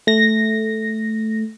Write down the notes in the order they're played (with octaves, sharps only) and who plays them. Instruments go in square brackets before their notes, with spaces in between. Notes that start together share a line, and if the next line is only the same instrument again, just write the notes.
[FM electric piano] A3 A#6